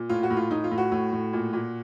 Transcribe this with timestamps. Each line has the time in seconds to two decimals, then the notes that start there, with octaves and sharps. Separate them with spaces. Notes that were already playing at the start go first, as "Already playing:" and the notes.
Already playing: A#2
0.10 A2 F4
0.23 F#4
0.30 A2
0.37 F4
0.51 A2 D#4
0.64 F4
0.71 A2
0.78 F#4
0.92 A2
1.12 A2
1.33 A#2
1.53 A#2